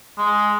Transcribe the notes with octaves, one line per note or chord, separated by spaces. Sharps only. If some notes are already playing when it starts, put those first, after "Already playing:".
G#3